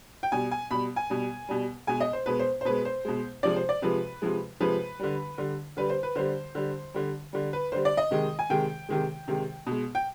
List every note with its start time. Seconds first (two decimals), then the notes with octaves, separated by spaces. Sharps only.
0.23 G5
0.32 B2 G3 G#5
0.51 G#5
0.71 B2 G3 B5
0.96 G#5
1.10 B2 G3
1.49 B2 G3
1.87 B2 G#3 G#5
2.00 D#5
2.13 C5
2.26 B2 G#3 B4
2.39 C5
2.61 C5
2.65 B2 G#3 B4
2.85 C5
3.05 B2 G#3
3.43 C3 F3 G#3 D5
3.56 C5
3.69 D5
3.82 C3 F3 G#3 B4
4.22 C3 F3 G#3
4.60 C3 F3 G#3 B4
4.99 D3 G3
5.38 D3 G3
5.77 D3 G3 B4
5.90 C5
6.03 B4
6.15 D3 G3 C5
6.55 D3 G3
6.94 D3 G3
7.33 D3 G3
7.53 B4
7.72 D3 G3 C5
7.85 D5
7.97 D#5
8.11 C3 D#3 G#3
8.39 G#5
8.50 C3 D#3 G#3 G5
8.89 C3 D#3 G#3
9.28 C3 D#3 G#3
9.66 B2 G#3
9.95 G5